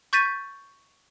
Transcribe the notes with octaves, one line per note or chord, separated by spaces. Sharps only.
C#6 G6 A6 B6 D#7